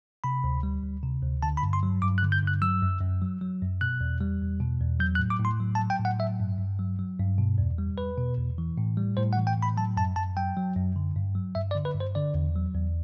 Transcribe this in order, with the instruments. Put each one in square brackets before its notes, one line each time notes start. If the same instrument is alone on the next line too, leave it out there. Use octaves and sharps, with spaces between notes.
[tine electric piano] C3 B5
D2
G3
D2
C3
D2
D3 A5
B5
G2
C6
F#3
G2 D6
F#6
D3
G6
G2
F#6
F#3 E6
F#2
F#2
F#3
F#3
F#2
B2 F#6
E2
G3
E2
B2
E2
F#3 G6
F#6
A2
D6
A2
C6
F#3
A5
F#3
G5
A2
F#5
F#3 E5
G2
G2
F#3
F#3
G2
B2
E2
G3
E2 B4
B2
E2
E3
A2
G3
A2 C5
F#5
E3
G5
A2
B5
F#3 A5
F#2 A5
F#2 A5
F#3 G5
F#3
F#2
D3
G2
F#3
G2 E5
D5
D3
B4
G2
C5
D3 D5
E2
F#3
E2